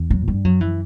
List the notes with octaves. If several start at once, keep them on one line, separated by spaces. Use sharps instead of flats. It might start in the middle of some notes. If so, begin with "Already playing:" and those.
Already playing: E2
F#3
A#2
G3
G2
F#2 F#3
E3